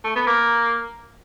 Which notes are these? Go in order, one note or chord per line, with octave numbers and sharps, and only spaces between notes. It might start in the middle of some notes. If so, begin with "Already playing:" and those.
A3
B3
A#3